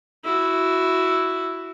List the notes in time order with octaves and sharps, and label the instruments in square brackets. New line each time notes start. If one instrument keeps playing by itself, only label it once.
[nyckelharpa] E4 F#4